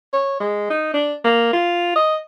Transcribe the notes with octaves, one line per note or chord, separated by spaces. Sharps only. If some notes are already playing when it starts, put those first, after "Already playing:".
C#5
G#3
D#4
D4
A#3
F4
D#5